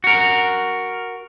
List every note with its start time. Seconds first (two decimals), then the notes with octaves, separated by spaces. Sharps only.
0.04 F#4 A#4